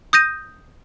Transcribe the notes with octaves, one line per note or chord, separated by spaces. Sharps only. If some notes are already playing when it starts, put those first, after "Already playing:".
D#6 G6 A#6 D#7